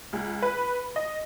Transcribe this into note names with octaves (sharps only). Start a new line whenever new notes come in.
C#2
B4
D#5